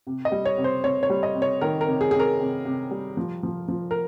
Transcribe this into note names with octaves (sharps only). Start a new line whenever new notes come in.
C3
D#5
G3
C#5
C3
C5
C3 C#5
C#5
G3
D#5
C3
C#5
D#3 A#4
A#4
C3
G#4
C3 G#4
A#4
C3
C3
G3
F3
F3
F3
A#4